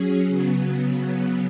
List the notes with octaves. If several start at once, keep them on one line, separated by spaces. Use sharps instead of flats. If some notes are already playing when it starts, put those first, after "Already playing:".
Already playing: F#3 C#4 G#4
C#3 F#3 B3